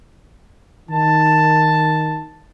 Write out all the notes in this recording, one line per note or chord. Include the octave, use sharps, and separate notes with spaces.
D#3 A5